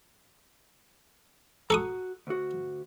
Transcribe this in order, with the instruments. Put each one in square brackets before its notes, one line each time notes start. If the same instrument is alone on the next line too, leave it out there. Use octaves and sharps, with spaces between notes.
[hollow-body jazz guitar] F#4 A#5 [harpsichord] A4 C#6 D#6
[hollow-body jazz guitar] D2 F#4